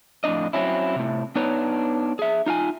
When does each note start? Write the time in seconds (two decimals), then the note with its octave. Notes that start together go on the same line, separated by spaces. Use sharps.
0.24 F2 A2 B3 D4 D#5
0.53 F#3 C4 C#4 E4
0.96 A2 C3
1.36 B3 D4 D#4 B4 C#5
2.19 G#4 E5
2.46 D#4 F4 F5 G#5